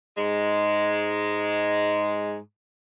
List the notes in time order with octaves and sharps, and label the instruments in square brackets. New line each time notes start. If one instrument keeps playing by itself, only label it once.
[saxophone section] G#2 G#3